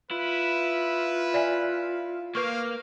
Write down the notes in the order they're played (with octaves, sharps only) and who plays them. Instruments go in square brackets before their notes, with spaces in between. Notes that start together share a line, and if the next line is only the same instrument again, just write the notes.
[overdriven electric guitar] E4 [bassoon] F4 [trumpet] B4
[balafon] D5 E5 G#5
[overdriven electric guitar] A#3 [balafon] B4 C#6 [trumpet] F5